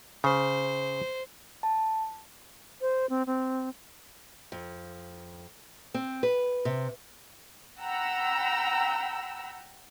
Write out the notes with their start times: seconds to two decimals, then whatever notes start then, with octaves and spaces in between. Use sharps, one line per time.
0.24 C#3 C5
1.63 A5
2.81 C5
3.09 C4
3.26 C4
4.52 F2
5.94 C4
6.23 B4
6.65 C3
7.81 F#5 G5 A#5 B5 E6